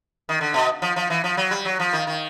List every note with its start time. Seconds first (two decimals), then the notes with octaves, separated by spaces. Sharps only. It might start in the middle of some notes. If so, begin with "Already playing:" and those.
0.29 D#3
0.41 D3
0.54 B2
0.82 F3
0.96 F3
1.10 E3
1.24 F3
1.37 F#3
1.51 G3
1.65 F#3
1.80 F3
1.93 D#3
2.07 D#3